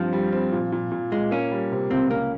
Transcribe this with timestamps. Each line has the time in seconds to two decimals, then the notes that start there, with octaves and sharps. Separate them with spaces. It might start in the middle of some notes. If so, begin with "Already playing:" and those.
Already playing: G2 F3 C4
0.13 G3
0.32 C4
0.52 A#2
0.72 A#2
0.92 A#2
1.12 A#2 G#3
1.31 A#3 C#4
1.51 G3
1.72 C3
1.91 C#2 C4
2.11 A#3 C#4